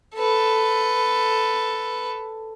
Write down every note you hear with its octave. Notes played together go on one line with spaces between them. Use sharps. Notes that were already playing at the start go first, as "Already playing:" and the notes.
A4 B4